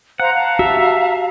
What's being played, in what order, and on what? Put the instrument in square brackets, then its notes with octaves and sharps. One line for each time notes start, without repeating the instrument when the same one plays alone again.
[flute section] C5 F5 A#5 [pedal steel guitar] F#5
[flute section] F5 A5 A#5
[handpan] F#4 G4 [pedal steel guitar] E5